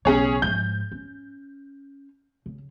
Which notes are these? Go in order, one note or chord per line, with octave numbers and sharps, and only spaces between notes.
B1 C#3 C#4 G#4 C#5
G#2 F3 G6
C#4
C#3